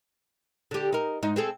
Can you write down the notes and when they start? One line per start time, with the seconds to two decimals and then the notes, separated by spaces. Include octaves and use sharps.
0.71 D3 G4
0.93 D#4 A#4
1.23 G#2 D#4
1.36 C4 G#4 A4